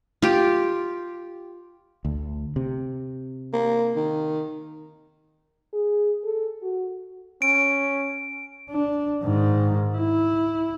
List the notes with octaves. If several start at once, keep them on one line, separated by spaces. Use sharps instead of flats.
F4 G4
D2
C3
A#3
D#3
G#4
A4
F#4
C#4 D7
D4
G#2 D#3
E4